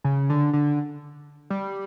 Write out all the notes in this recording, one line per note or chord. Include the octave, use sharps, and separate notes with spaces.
C#3
D3
D3
G3